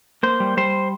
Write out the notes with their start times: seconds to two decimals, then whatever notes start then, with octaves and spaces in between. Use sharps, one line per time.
0.23 A#3 C5
0.40 G3
0.57 G3 C5